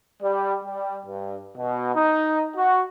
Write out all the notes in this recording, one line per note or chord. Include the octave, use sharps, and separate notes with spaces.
G3
G3
G2
B2
D#4
F#4